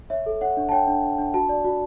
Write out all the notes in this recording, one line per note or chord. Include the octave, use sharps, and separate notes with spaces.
C#5 E5
A4
C#5 F#5
D4
A5
C#5 G5
D4
D4
D4
F#4 A5
D5
F#4